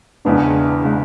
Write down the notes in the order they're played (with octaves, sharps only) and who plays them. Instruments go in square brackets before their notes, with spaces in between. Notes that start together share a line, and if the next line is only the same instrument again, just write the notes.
[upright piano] E1 E2 C#3 G#3 [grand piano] B3 D4
[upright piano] C#3 G#3